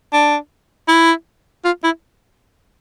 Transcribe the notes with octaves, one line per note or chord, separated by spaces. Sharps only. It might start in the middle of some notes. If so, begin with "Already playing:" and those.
D4
E4
F4
E4